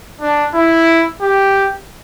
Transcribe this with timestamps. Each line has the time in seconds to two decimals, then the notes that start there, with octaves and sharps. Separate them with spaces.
0.21 D4
0.54 E4
1.22 G4